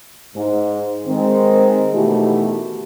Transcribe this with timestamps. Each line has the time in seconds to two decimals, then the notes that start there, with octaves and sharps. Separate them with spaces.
0.35 G#2
1.07 D#3 G#3 C4
1.94 B2 D#3 E3 A3 E4 G4